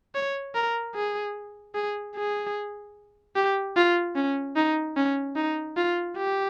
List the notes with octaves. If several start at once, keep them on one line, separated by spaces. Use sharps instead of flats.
C#5
A#4
G#4
G#4
G#4
G4
F4
C#4
D#4
C#4
D#4
F4
G4